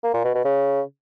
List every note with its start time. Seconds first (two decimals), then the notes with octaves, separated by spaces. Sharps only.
0.03 A#3
0.14 A#2
0.24 B2
0.34 B2
0.44 C#3